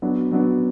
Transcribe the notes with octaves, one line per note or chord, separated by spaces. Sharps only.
F#3 B3 D4
F#3 B3 D4